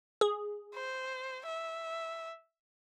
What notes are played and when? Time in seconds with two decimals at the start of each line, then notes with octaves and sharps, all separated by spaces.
0.21 G#4
0.75 C5
1.46 E5